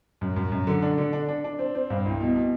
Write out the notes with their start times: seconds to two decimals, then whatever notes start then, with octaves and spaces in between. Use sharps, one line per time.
0.21 F#2
0.36 F#2
0.52 F#2
0.67 D3
0.82 D4
0.98 D3
1.13 D4
1.28 D4
1.44 D4
1.59 C4
1.75 C4
1.90 G2
2.06 C2
2.20 B2
2.36 B2